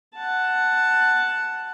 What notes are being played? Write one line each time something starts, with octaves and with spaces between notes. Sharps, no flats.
F#5 A5